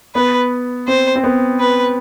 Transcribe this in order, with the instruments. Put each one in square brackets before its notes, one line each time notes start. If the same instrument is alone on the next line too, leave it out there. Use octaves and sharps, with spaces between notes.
[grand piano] B3 [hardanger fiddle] B4
[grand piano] C4 [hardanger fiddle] C5
[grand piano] C4
B3
[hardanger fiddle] B4